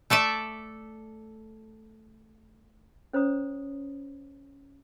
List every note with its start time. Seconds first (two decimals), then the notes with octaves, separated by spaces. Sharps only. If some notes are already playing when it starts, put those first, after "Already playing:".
0.10 A3 A4 D5 E5
3.13 C#4 C5 C#5 A#5 D#6